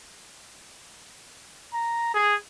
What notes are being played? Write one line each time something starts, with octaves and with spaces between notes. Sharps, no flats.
A#5
G#4